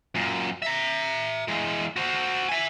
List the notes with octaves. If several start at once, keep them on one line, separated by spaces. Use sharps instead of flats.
F#2 A#2
E5 A#5
E3 G#3
F#4 C5
E5 G#5